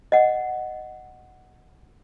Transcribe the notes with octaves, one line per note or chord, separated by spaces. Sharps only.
D#5 F#5